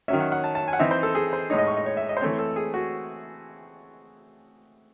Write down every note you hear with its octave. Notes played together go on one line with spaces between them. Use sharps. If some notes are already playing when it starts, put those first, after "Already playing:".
D#3 F#3 C#4 E5
F#5
F#5
A5
A5
G#5
F#5
E3 C4 D#4 E5
C5
A4
G#4
C5
A2 G#3 D#4 C#5
D#5
C#6
D#5
C#5
E5
D#5
C5
E3 A3 C4 C#5
A4
G#4
F#4